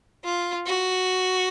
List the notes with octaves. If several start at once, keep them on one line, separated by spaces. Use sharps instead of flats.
F4
F#4